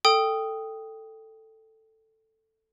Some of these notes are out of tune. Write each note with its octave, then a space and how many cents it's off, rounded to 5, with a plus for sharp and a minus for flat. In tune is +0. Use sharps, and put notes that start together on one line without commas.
A4 +5 G5 +0 D#6 +0